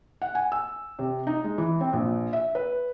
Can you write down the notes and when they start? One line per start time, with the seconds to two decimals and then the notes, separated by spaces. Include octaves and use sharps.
0.22 F#5
0.35 G#5
0.52 E6
0.99 C3
1.27 D#4
1.44 G#3
1.58 E3
1.81 C4
1.93 A#1
2.33 E5
2.55 B4